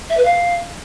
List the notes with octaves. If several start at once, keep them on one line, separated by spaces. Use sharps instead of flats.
E5
B4
F5